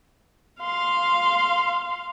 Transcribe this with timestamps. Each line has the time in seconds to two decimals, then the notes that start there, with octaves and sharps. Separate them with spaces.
0.61 F5 C6